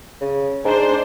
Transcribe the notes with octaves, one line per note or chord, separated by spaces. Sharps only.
C#3
G#2 D4 C5